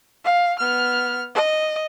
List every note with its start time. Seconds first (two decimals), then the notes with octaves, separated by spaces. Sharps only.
0.25 F5
0.59 B3 F6
1.35 D#5